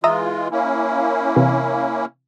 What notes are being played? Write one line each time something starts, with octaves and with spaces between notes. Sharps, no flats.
E3 G#3 F4 E5 A#5 D#6
A#3 C#4 E4
C3 E3